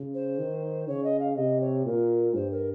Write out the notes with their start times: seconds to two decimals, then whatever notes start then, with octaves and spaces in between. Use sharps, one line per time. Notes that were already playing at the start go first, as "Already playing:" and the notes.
Already playing: C#3
0.14 C5
0.39 D#3
0.88 C#3 C#5
1.04 D#5
1.20 F5
1.36 C3 D#5
1.61 C#5
1.85 A#2 A#4
2.34 G2 C5
2.51 A#4